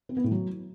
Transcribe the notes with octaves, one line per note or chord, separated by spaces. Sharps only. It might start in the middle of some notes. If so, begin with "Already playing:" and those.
C4
B3
A2
F#3